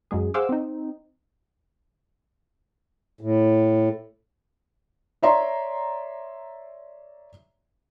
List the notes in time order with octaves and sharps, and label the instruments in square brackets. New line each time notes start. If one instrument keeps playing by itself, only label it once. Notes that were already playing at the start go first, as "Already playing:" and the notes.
[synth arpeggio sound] F#2 F#3 G#3 G#4
G#4 C5 F5 F#5 D6 E6
C4 D#4
[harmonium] A2
[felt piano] C#5 D5 E5 A#5 C6